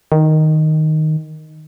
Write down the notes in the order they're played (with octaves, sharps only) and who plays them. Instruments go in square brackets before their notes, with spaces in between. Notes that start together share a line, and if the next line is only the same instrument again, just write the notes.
[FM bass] D#3